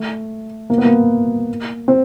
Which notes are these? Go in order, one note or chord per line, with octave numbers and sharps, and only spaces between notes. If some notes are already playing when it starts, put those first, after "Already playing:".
Already playing: A3
A#3
B3
A#3
C4